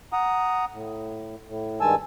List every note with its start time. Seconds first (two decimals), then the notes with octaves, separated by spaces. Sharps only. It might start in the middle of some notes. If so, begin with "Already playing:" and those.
0.13 F#5 A#5 D#6
0.73 A2
1.48 A2
1.81 G2 D#3 G#3 G#5 A5 E6